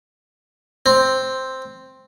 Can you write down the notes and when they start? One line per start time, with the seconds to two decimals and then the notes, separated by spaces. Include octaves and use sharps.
0.86 C4